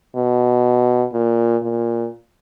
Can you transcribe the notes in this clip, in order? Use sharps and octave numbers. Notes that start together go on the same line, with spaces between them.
B2
A#2
A#2